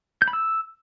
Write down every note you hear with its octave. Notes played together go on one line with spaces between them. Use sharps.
G6
B5
E6